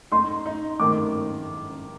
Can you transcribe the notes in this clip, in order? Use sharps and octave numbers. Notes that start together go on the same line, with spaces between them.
D#4 C6
D#4
D#3 D6